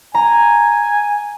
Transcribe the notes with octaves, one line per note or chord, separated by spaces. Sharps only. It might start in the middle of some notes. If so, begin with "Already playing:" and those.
G#5 A#5